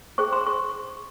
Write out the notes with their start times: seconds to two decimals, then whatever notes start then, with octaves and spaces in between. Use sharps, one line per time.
0.18 C#4 G#4 C5 C#6
0.33 C6
0.47 C#6